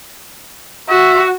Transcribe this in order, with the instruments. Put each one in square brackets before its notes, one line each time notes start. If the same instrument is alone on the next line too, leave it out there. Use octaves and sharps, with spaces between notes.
[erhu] F#4 [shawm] E5